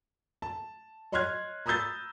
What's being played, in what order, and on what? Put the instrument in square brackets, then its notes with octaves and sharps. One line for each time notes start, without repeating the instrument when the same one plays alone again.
[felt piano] A5
C#5 D#5 C6 F6 F#6 G#6
A#5 B5 D#6 E6 G6 A6